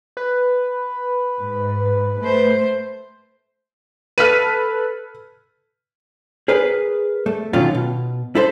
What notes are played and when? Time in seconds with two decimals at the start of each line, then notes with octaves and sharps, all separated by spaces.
0.17 B4
1.40 G#2
2.21 A3 C5
4.18 A4 B4 F6 B6 D#7
6.48 G#4 A#4 B4
7.26 A3
7.53 B2 D3 D#3 F#3 C#4 F4
7.75 B2
8.35 E4 A4 C5